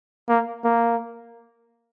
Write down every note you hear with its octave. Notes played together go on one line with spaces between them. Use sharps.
A#3
A#3